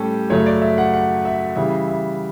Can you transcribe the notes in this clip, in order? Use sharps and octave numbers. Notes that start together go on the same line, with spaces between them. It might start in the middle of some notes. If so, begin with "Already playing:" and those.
Already playing: A2 G3 C#4 G4 A4
F#2 C#3 F#3 A3 C#5
D5
E5
F#5
F#5
E5
C#3 E3 G3 E5
E5